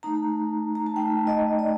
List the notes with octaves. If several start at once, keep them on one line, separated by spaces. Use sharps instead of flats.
A3 D#4 A#5
A#5
A5
A3 D#4 G5
D#5
D5